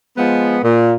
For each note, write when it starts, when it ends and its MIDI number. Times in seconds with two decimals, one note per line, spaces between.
0.18 0.58 53
0.18 0.58 56
0.18 0.58 59
0.64 0.94 46